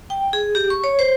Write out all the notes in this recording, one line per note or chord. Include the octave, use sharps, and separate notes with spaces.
G5
G#4
G4
C#6
C#5
C5